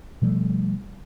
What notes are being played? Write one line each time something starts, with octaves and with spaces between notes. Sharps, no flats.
B2 F3 G3 A3